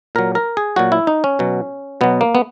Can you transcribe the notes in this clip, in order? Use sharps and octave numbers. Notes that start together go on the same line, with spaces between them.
A#2 F#3 A#4
A#4
G#4
A#2 F#3 F#4
E4
D#4
C#4
B2 F#3
B2 F#3 B3
A#3
B3